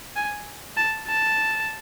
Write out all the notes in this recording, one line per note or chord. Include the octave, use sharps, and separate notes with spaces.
G#5
A5
A5